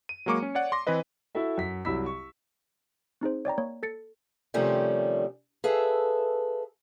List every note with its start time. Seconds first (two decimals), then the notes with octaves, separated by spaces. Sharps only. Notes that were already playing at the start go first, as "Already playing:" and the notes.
0.09 D#7
0.26 F#3 G#3 A#3 C#6 D6 C#7
0.42 C#4
0.55 C#5 D5 F#5
0.72 C6 D6 A#6
0.87 E3 C4 E4 B4 D#5
1.35 E4 F#4 A4 E5
1.58 F#2 B6
1.85 C2 F#3 E4 B5 E6 B6
2.06 C#6
3.21 C4 D#4 G#4 C5
3.45 C#5 D5 G5 A#5
3.58 A#3 C#5
3.83 A4 A6 C#7
4.54 C3 D#3 F3 G3 A3 C#4
5.64 G#4 A4 B4 E5 F5 A5